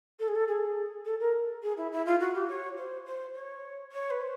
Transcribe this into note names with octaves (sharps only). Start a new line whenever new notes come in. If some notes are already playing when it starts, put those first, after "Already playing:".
A4
G#4
A4
G#4
A4
A#4
G#4
E4
E4
F4
F#4
G4
C#5
C5
C5
C#5
C#5
B4
C5